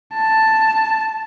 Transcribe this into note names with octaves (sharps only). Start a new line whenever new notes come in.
A5